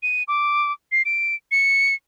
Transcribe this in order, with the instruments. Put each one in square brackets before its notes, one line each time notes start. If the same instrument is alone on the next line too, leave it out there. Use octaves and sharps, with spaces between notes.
[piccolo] D#7
D6
C7
D7
C#7